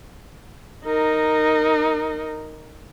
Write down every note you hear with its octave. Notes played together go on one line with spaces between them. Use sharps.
D#4 A#4